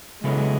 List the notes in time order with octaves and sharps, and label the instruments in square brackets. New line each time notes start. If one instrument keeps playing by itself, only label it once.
[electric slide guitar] C#3 F#3 B3 E4 A4 [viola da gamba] G#3